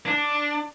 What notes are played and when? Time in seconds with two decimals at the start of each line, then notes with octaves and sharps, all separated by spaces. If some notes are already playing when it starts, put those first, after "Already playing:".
0.06 D4